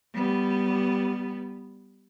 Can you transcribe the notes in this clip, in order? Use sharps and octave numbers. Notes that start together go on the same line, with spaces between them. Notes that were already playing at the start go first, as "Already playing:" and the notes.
G3 B3